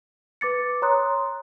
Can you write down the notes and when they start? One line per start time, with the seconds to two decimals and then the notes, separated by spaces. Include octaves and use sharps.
0.41 B4 D6 A6 C#7
0.82 C#5 A#5 C6 D#6 F#6